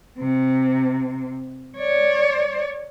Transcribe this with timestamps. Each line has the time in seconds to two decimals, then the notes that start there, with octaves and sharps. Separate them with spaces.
0.19 C3
1.78 C#5 D5